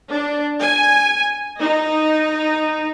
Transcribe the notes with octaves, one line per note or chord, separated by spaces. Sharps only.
D4
G#5
D#4